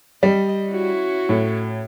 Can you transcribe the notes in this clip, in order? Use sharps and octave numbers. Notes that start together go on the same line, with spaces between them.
G3 D#5
C#4 E4 F#4
A2